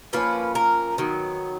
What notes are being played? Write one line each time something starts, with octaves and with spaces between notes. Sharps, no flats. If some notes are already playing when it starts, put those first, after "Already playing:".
F3 A#3 C#4 B4
A#4
D#3 F#3 B3